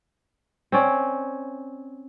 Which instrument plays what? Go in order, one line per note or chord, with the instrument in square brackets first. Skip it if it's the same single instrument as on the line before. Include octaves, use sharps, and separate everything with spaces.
[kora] C4 C#4 D5